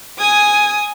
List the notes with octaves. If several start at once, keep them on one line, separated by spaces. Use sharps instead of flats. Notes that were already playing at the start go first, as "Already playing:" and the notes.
G#5 D#6 G#6